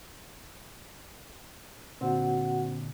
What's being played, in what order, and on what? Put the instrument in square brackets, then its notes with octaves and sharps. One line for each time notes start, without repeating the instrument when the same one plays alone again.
[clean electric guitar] A#2 D3 D4 [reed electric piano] C4 [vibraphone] F#4 F#5